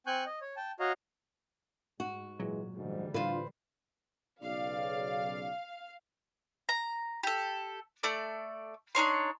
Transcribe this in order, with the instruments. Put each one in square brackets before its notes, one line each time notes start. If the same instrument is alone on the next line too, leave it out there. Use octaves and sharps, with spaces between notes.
[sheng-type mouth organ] C4 G#5 C#6 F#6 G6
D#5
C#5
G5 A5
F#4 C#5 D#5 F5 A#5
[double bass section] G#2 [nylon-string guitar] F#4
[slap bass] A#2 F#3 [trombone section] E3 G#3
[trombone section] D2 G#2 [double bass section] D3 E3 G3
[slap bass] A2 [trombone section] D4 F4 [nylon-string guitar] B4 C5
[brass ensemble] B1 C#3 D5 [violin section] F5
[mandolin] A#5
G4 A4
A3 A4 D5
D4 D#4 C#5 C6